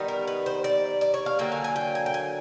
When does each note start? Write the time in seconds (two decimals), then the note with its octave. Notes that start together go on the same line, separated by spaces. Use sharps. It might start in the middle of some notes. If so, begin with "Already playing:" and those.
Already playing: D#3 G3 B3 D#4
0.08 A#4
0.27 B4
0.46 C5
0.64 D5
1.01 D5
1.14 C#5
1.26 F5
1.39 D3 F#3 A#3 G5
1.52 G#5
1.64 G#5
1.76 G5
1.95 G#5
2.06 G5
2.14 G#5